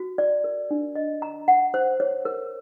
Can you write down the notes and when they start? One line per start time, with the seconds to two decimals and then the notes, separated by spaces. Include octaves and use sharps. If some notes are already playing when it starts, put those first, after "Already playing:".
Already playing: F#4
0.18 D5
0.44 A#4
0.71 D4
0.95 D#5
1.22 A#5
1.48 F#5
1.74 C5
2.00 C#5
2.25 A#4